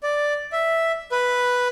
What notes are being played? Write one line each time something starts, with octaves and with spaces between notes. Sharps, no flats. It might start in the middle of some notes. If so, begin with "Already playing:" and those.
D5
E5
B4